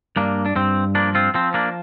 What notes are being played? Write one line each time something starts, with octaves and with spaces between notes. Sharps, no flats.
G2 A#3 D4
D4
G2 C4
F3 A#3 D4
C4 F4
F3 C4
A#3 D4